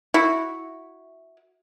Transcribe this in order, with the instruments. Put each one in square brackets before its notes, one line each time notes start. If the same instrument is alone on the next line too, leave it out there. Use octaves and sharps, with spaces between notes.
[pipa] E4 F#4